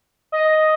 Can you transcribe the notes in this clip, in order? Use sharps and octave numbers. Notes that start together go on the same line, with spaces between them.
D#5